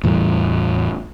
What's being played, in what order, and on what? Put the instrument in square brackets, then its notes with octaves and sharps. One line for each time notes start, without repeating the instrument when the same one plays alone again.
[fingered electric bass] E2 A2 E3 G3